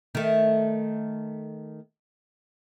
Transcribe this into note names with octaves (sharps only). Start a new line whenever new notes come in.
D#3 A3